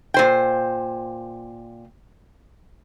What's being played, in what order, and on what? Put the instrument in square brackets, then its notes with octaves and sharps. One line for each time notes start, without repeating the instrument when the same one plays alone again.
[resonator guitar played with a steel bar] A#2 C5 G5